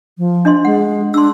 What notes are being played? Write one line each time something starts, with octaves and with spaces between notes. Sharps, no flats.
F3
D4 D#5 C6
G#3 F#5
D4 C6 E6